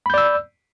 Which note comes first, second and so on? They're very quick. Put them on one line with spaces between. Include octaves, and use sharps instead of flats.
B5 G6 D5 E6